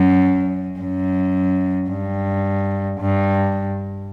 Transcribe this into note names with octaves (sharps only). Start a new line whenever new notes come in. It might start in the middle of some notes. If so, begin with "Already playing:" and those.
Already playing: F#2
F#2
G2
G2